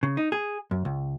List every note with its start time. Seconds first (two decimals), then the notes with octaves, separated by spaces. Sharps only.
0.03 C#3
0.17 D#4
0.32 G#4
0.71 F#2
0.85 C#2